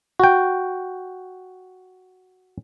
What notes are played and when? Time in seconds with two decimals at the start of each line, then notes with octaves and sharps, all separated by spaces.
0.20 F#4 G5